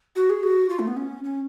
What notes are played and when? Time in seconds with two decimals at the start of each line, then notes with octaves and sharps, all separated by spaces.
0.16 F#4
0.30 G#4
0.43 F#4
0.70 F4
0.79 A3
0.87 B3
0.97 C#4
1.24 C#4